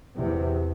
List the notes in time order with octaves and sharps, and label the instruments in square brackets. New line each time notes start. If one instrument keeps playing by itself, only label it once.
[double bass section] E2 C3